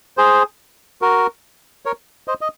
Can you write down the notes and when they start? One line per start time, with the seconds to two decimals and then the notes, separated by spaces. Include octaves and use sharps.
0.17 G#4 C5
1.01 F#4 A#4
1.85 A#4 C#5
2.28 C5 D#5
2.41 D#5